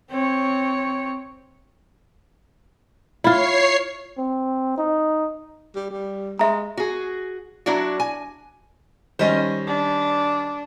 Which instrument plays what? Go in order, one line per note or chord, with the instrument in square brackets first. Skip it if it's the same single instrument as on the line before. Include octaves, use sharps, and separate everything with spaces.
[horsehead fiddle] C4 C#5
[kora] E4 F4 [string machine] C#5 C7
[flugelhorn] C4
D#4
[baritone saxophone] G3
G3
[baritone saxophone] G#3 [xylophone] E5 A#5
[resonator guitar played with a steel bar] F#4 G#4
F#3 D4 E4 F#4
G#5
[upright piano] D#3 G3 C#4 [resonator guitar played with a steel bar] C5 D#5
[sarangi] D4